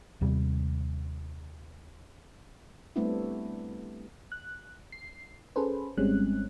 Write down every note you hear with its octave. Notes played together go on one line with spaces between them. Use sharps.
D#2 C3 G3
G3 A3 B3 C4 D4 E4
F#6
C7
C#4 G#4 A4 B4 C5
G#1 G3 G#3 C4 C#4 F#6